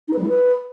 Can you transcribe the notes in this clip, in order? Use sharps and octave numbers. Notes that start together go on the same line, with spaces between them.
D#4
B4
G3
E4
B4